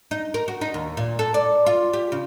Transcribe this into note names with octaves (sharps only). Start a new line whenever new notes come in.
D#4
A#4
F#4
D#4
D#2
A#2
A4
D5
F4
G4
C#3